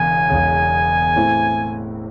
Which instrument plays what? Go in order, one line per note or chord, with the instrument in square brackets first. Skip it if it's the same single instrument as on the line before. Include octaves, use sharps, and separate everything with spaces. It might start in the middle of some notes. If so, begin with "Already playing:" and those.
Already playing: [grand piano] E1 E2 C#3 [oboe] G#5
[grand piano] E1 E2 C#3
A2 E3 C4 E4